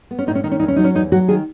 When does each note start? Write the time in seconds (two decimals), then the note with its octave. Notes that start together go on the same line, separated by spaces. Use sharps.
0.11 B3
0.19 C#4
0.27 A2 D#4
0.35 C#4
0.44 D#3 D#4
0.51 C#4
0.60 E2 D#4
0.68 C#4
0.76 F#3 D#4
0.84 C#4
0.95 E2 D#4
1.12 F#3 F#4
1.28 D#3 G#4